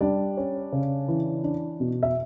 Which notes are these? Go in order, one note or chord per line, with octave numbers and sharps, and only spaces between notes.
G3 D4 D5
C#4
C#3
E3
D4
B2
E5